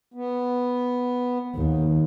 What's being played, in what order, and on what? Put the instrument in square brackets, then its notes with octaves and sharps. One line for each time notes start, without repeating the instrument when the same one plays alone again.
[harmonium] B3
[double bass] D#2